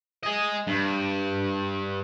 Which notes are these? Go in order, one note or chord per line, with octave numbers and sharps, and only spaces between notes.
D#5 G#5
G2